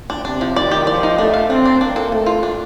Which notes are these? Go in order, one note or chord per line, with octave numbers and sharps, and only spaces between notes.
D4
C3 D4
F3
D#3 D5
G4
F3 D5
D#4
A3 D4
F5
C4 D4
D4
A#3 D4
A4
A3 A4
F4
D4